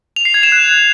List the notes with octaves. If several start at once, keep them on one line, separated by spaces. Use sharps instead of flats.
F7
C7
G#6
E7
F#6